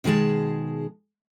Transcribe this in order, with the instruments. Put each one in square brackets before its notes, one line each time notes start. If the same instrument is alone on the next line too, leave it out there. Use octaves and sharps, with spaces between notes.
[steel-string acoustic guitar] B2 D#3 G#3 G#4 A5